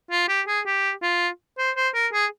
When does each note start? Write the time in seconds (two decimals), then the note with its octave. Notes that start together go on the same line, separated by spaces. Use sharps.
0.11 F4
0.29 G4
0.48 G#4
0.66 G4
1.03 F4
1.58 C5
1.76 C5
1.94 A#4
2.13 G#4